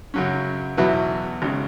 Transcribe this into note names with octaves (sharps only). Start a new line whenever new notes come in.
F#2 C#3 F#3 C#4
E2 B2 F#3 E4 B4
G#1 C#3